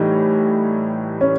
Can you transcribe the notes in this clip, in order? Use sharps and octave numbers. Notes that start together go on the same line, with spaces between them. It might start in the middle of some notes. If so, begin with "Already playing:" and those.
Already playing: A2 E3 G3 D#4
C#4